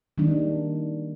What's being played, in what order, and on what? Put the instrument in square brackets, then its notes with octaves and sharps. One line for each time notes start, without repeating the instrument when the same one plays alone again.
[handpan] D#3 G3 G#3 A#3 D4 D#4